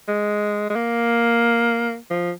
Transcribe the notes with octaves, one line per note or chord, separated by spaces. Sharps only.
G#3
G#3
A#3
F3